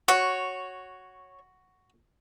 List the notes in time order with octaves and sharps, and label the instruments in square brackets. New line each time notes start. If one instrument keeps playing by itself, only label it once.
[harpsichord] F#4 [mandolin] C#5